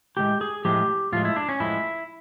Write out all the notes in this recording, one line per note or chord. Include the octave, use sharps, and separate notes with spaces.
A2 F3 G#3 G4
G#4
A2 F3 G#3 G4
A2 F3 G#3 F4
E4
D4
C#4
A2 F3 G#3 E4